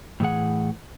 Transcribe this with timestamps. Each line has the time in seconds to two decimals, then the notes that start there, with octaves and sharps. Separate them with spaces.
0.20 A2 E3 G#4 F#5